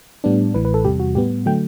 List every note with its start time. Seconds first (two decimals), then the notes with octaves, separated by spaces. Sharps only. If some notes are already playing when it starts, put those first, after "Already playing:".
0.24 A2 G3 B3 D4
0.54 A1 A2 E3 B4
0.65 B4
0.74 A4
0.85 E2 C3 G3 G4
1.00 F#4
1.15 A2 G3 B3 G4
1.46 D3 F#3 A3 G5